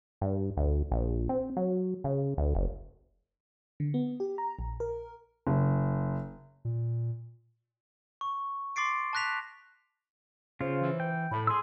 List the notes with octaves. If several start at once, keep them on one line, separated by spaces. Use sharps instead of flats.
G2
D2
A#1
C4
F#3
C#3
D2
F#1
D3
B3
G4
A#5
A#1
A#4
F#1
A#2
C#6
C6 D6 A6 C7 D7
A5 C#6 F#6 A#6 B6 F7
C#3 F4 C5
E3
G5
A2 B5
G#4 C6 E6